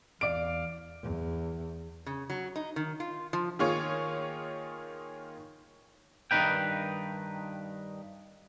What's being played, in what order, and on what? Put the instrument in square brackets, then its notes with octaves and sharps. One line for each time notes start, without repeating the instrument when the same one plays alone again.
[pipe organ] E2 F5 [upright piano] D5 D7
[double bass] E2
[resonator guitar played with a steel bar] C#3
F#3
D#4
D#3
F4
F3
[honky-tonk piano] D#3 A#3 F4 G#4 C#5
[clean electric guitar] G2 D#3 G#3 D#4 B4 G5